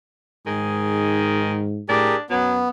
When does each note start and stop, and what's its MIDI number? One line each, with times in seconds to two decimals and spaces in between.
0.46 1.82 44
0.46 1.69 51
0.46 1.52 68
1.89 2.14 45
1.89 2.24 62
1.89 2.15 67
1.89 2.15 68
1.89 2.15 70
2.30 2.63 42
2.30 2.57 54
2.30 2.69 59